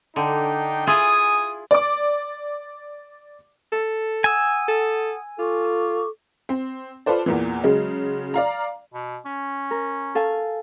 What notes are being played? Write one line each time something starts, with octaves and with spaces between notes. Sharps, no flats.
D3 D4 D#4 G5
E4 F4 G#4 G#5 D#6
D5 D6
A4
F#5 G#5 D#6 E6
A4
F4 A4 C#6 D6
C4
F4 A4 B4 C5 D5
E2 A#2 E3
C#3 F#3 G#3
D5 F5 A#5
B2
C#4
A#4
A4 F5 G#5